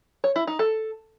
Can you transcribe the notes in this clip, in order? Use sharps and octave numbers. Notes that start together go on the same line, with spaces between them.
C#5
E4
D#4
A4